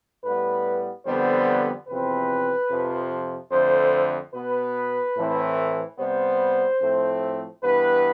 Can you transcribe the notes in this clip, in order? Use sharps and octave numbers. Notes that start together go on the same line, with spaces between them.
A2 G3 B3 B4
F2 D3 G3 B3 C5
E2 C3 F3 C4 B4
F2 C3 F3
F2 D3 A3 C5
B2 B3 B4
A2 E3 A3 C4
C3 G3 B3 C5
A2 F3 A3 C4
G2 E3 B3 B4